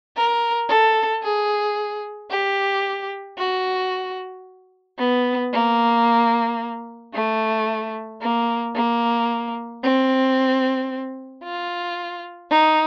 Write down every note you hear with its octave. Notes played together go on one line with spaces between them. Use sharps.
A#4
A4
G#4
G4
F#4
B3
A#3
A3
A#3
A#3
C4
F4
D#4